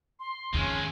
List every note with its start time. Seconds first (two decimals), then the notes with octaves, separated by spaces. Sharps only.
0.20 C6
0.54 F2 D#3 G#3 C#4